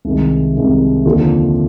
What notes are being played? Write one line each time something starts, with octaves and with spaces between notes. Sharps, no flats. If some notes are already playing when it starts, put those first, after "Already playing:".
C2 C3 D#3 G#3
C2 C3 D#3 G#3
D#2 D3 F3